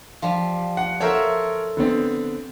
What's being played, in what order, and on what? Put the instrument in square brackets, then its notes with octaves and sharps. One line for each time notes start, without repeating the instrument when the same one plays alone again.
[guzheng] F3 G3
[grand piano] F#5
[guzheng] A4 C5 E5 [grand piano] A#4 C#5
[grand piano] D3 B3 C4